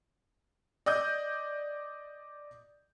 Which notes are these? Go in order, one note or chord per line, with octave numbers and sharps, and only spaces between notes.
D5 D#5 D#6 G6